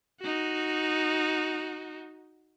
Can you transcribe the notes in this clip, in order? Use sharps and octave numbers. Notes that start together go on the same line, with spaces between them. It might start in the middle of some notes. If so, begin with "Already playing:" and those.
D#4 F#4